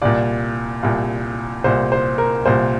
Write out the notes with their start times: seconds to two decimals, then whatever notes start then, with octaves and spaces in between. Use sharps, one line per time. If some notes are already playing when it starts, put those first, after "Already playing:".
0.02 C2 A#2 D5
0.83 C2 A#2
1.64 C2 A#2 C5
1.92 C5
2.18 A#4
2.46 C2 A#2 C5